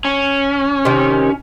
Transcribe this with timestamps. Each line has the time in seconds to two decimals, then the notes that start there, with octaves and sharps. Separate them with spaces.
0.05 C#4
0.85 C3 D#3